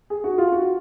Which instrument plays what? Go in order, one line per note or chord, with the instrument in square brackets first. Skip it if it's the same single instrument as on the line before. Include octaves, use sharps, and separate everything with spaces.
[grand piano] G#4
F#4
F4
F#4